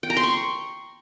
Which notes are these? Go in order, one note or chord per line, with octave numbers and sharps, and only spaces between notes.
G5
A#5
C6
C#6